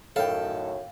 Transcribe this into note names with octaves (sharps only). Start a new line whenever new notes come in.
F#2 A2 D#3 A4 F5 G5